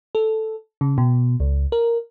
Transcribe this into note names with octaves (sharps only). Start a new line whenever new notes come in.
A4
C#3
B2
C#2
A#4